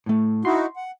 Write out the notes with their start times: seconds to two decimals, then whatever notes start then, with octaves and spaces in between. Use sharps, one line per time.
0.06 A2 A3
0.45 D#4 E4 F#4 C6
0.76 F#5